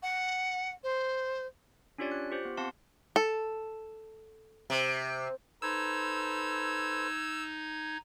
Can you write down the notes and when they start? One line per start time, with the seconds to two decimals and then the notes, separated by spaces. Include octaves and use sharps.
0.02 F#5
0.83 C5
1.98 C#4 D4 F4 G4 C#5 D5
2.12 F#6
2.31 F4 G4 C5
2.45 B3
2.57 C4 F5 F#5 A5 C6
3.16 A4
4.70 C3
5.62 D#4 A4 B4 C5 E6 G#6